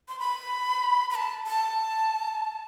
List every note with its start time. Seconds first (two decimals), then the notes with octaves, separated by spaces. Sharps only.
0.08 C6
0.19 B5
1.10 B5
1.15 A5
1.47 A5